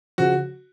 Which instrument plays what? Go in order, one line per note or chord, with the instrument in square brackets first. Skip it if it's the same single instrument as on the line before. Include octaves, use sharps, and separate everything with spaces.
[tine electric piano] C#3 F3 [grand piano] F#4